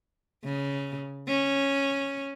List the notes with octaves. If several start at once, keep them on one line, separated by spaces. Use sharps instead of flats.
C#3
C#4